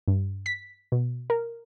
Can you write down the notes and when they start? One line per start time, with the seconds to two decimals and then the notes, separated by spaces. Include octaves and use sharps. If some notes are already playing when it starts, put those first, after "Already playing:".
0.08 G2
0.46 B6
0.92 B2
1.30 A#4